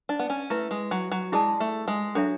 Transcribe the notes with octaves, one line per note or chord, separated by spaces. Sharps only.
D4
B3
C#4
A3 E4 B4 E5
G#3
F#3
F#3
G#3 E4 G#4 D5 A5
A3
G#3
F#3 D4 A4 C#5 E5